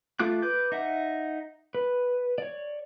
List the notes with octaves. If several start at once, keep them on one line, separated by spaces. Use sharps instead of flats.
A3 F4 D6 F#6
B4 D6 G6
D#4 E5 F#5
B4
C#5 D5